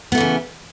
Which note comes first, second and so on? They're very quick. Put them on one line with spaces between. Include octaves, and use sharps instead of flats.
B3 A3 E3 C#3